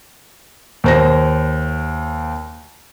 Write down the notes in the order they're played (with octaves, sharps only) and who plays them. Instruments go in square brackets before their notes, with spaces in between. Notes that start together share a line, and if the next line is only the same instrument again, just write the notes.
[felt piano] D#2 C5 A#6